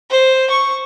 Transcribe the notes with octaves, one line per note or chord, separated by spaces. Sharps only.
C5
C#6